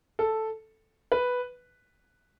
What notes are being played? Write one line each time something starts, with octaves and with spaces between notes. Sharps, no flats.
A4
B4